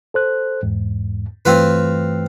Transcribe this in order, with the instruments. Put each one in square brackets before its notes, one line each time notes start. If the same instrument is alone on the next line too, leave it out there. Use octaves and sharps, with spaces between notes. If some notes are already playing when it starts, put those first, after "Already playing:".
[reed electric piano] A4 C5 F#6
E2 G#2
[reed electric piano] G2 E3 A3 [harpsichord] C4 F4 B4